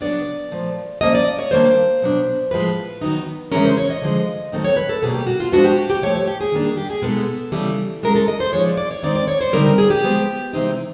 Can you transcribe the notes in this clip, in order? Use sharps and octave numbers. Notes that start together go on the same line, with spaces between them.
C#3 F#3 B3 D4 D5
A#2 F3 A3
F3 A#3 C#4 D#5
D5
C#5
D#3 G3 A#3 D4 C5
B2 F#3 B3 D4
A2 F3 G#3 B4
D#3 F#3 B3 D#4
C#3 E3 G#3 C#4 A#4
C5
C#5
D#5
D3 F3 G#3
D#3 F#3 A3 C4 D#4
C#5
B4
A4
B2 G3 A#3 G#4
G4
F#4
F4
F3 G#3 B3 D4 F#4
G4
F#4
G4
A2 F3 A3 C#5
C#5
G4
G#4
D#3 G3 A#3 D4
G#4
G4
G#4
B2 G#3 B3 D#4 A4
C#3 E3 G3
E3 G#3 C#4 A#4
A4
D#5
C5
F3 G#3 B3 D#4 C#5
D5
D5
C#5
D#3 G#3 C4 D#4 D5
D5
C#5
C5
D3 G3 C4 D#4 A#4
A#4
G#4
G4
F3 G#3 B3
C3 E3 G#3 C4 D#4